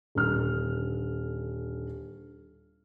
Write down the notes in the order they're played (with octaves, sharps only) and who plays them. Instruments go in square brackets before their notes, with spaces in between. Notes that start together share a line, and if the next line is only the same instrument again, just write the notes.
[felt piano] D#1 D3 F6